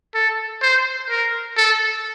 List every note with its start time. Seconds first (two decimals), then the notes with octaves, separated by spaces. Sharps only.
0.14 A4
0.62 C5
1.10 A#4
1.57 A4